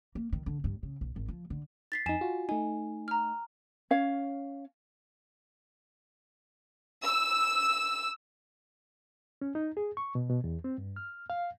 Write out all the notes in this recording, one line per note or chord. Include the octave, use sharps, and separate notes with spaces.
A#3
D#3
D3
G2
C#3
B1
G#1
F3
D3
A6 B6 C7
F2 D#4 G#5 E7
F4 F#4
A3 D#4 G#5
A#5 F6
C#4 C#5 F5
E6
C#4
D#4
G#4
C#6
B2
B2
E2
C4
G2
F6
F5